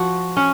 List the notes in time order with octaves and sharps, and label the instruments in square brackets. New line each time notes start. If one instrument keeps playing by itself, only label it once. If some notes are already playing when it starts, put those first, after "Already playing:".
Already playing: [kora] F3 F#4
C#4